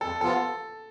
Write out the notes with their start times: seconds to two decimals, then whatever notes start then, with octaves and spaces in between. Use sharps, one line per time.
0.01 F2 A4
0.21 C3 F3 B3 F4 A4